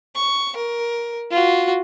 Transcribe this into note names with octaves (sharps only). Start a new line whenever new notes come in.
C#6
A#4
F4 F#4